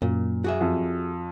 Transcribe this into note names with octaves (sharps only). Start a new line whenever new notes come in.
F#2 A#2
F#4 G#4 E5
F2